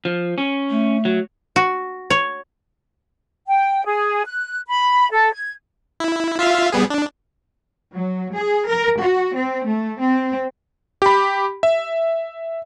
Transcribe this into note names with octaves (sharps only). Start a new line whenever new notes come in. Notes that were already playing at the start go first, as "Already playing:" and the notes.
F3
C#4
A3
F#3
F#4
C#5
G5
G#4
F#6
B5
A4
G#6
E4
F4 E5 F5
G3 B3 G#4
D4
F#3
G#4
A#4
F#4
C4
A3
C4
G4 B5
E5